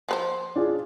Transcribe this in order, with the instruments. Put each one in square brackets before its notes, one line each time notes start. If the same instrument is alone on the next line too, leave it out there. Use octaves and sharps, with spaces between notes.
[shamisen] F3 B4 C5
[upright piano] D4 F4 G#4